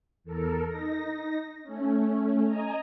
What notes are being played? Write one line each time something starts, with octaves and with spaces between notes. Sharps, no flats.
E2 A4 A#4
D#4 A#6
A3 C#4
D#5 G#5 A#5